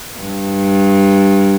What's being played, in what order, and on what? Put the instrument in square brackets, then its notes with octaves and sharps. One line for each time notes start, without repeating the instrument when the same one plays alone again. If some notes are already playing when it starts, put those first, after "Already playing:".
[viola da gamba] G2